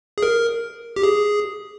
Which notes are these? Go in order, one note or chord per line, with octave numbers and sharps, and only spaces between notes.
G#4
A#4
G4
G#4